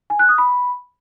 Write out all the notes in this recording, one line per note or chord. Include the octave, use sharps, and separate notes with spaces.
G#5
F#6
D#6
B5